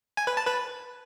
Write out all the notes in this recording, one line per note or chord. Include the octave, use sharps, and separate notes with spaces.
G#5
B4
A5
B4